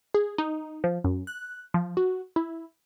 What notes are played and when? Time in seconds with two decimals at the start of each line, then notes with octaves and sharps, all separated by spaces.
0.14 G#4
0.38 D#4
0.84 F3
1.04 F#2
1.27 F#6
1.74 F3
1.97 F#4
2.36 E4